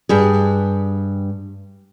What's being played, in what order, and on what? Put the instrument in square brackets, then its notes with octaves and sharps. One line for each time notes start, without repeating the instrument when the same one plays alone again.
[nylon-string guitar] G2 G3 G#4